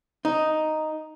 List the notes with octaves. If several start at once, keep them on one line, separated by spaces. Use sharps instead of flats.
D#4